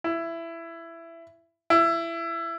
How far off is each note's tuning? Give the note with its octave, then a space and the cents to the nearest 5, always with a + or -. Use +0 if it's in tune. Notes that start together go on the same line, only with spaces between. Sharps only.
E4 +15
E4 +20